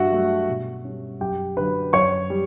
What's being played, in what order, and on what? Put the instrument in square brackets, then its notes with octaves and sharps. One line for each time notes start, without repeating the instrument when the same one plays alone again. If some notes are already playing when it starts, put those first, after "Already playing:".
Already playing: [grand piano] G2 F#4 E5 F#5
F#3 A3
B2
G3 C#4
F#2 G4 G5
D3 F#3 B4 B5
F#2 C#5 C#6
G3